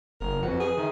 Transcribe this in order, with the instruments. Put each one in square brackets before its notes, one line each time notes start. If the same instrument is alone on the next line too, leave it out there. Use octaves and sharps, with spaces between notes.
[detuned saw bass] F#1 [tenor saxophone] A#4
[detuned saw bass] F2 [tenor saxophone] F#4 [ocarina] B4
[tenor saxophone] G#4
[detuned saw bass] D#3 [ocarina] E5